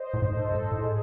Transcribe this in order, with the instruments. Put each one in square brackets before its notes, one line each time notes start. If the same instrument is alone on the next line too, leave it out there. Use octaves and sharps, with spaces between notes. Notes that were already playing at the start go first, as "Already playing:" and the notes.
Already playing: [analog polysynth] C5 D#5
[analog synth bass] A2
G#2
[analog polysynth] A4
[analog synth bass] G#2
A2
[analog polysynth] A4
G#4